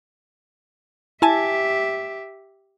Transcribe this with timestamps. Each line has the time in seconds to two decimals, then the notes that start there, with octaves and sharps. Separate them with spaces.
1.22 E4 G4 E5 G#5 A5